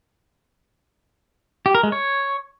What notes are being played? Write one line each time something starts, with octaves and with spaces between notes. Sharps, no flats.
G4
A#4
G#3
C#5